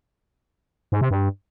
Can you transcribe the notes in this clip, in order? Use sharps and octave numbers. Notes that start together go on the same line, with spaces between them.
G#2
C3
G2